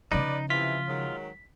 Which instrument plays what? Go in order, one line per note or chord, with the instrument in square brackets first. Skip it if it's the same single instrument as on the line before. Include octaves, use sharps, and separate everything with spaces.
[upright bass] C#3 F3 [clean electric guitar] D#4 [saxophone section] B4 D5
[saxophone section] C3 E3 E4 [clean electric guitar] F4 [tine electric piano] B6
[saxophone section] D#3 F#3 G#3